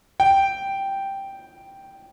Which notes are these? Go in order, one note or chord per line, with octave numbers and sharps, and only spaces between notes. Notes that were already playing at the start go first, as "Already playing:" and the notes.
G5